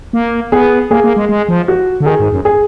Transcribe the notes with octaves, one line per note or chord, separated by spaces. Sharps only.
A#3
B3 G#4
A#3 G#4
A#3
G#3
G#3
F3
F#4
D3
D#3 G#4
G#2
F#2
G#4